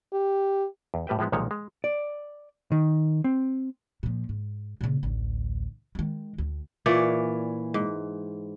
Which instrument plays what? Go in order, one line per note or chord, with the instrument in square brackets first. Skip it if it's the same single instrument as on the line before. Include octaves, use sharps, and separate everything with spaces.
[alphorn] G4
[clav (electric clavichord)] E2
A2 G3 B4 E5 G5
A2 F3 G#3 B3
B1 A#2 D#3 F3 G#3 C#5
G#3
[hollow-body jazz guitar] D5
D#3
C4
[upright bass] A#2 F3
G#2
A#2 C#3
A1 D2
D#3 G#3
D2
[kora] A#2 E3 C#5 D5
G#2